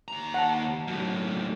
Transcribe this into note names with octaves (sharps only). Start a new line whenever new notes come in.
D#2 A#5
F#5 A5
F#2 A2